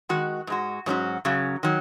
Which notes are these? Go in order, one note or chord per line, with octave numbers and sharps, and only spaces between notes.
D#3 G#3 F#4
G#2 G#3 F#4
G#2 F#3 C#4 F#4
F#2 C#3 F#3
D#3 F#3